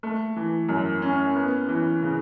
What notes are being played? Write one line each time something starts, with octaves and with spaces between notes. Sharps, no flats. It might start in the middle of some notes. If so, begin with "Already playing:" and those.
A3
E3
F#2
C#4
B3
E3
C#3